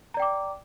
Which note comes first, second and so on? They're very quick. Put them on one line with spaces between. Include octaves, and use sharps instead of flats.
A#5 D5 G5 D6